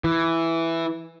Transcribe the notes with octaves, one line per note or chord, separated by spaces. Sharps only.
E3